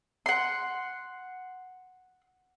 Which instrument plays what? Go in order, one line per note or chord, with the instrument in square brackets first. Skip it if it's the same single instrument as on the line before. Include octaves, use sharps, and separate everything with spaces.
[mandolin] F#5 C6